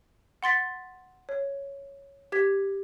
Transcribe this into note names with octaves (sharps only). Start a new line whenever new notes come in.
F#5 C6 A6 B6
C#5
G4 G#6 B6